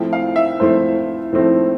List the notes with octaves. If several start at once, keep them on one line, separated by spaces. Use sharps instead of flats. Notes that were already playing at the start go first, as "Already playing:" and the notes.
Already playing: A2 F3 A3 C4 E4 G5
F5
E5
A2 F3 A3 C4 E4 C5
A2 F3 A3 C4 E4